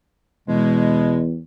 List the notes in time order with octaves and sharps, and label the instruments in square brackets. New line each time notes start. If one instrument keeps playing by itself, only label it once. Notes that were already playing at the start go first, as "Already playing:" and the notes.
[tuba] E2 [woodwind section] B2 G#3